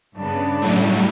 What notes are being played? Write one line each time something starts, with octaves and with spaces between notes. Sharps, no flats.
G2 C#3 B3 D4
A2 F#3 G3